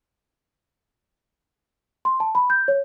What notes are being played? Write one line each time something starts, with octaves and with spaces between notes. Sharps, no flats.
C6
A5
B5
G6
C#5